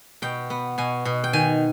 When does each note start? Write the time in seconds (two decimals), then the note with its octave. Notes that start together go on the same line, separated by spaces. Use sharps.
0.22 B2 G5
0.50 B3
0.78 B2 G#5
1.05 B2
1.24 G5
1.33 D#3 G#5